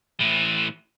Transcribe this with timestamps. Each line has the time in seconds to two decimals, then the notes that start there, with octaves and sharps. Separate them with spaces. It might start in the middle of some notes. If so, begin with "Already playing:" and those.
0.20 A2 E3